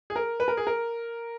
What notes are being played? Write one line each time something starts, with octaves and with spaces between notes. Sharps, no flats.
G#4
A#4
B4
A#4
G#4
A#4